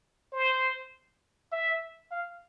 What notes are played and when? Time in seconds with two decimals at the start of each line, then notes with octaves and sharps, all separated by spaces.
0.33 C5
1.52 E5
2.11 F5